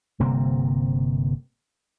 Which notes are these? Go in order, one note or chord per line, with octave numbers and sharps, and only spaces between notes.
G1 C3 A#3 C4